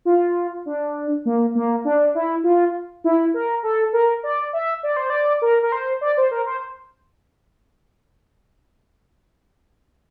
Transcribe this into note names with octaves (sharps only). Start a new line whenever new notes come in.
F4
D4
A#3
A#3
D4
E4
F4
E4
A#4
A4
A#4
D5
E5
D5
C5
D5
A#4
A#4
C5
D5
C5
A#4
C5